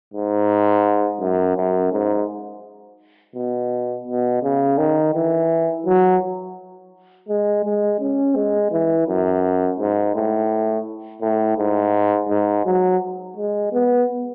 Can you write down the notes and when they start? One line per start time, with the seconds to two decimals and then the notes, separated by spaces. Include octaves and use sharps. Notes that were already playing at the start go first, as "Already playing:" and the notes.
0.14 G#2
1.20 F#2
1.57 F#2
1.92 G#2
3.35 B2
4.07 B2
4.43 C#3
4.78 D#3
5.14 E3
5.86 F#3
7.29 G#3
7.64 G#3
8.00 C#4
8.35 G#3
8.71 E3
9.07 F#2
9.79 G#2
10.14 A2
11.22 A2
11.58 G#2
12.29 G#2
12.65 F#3
13.36 G#3
13.72 B3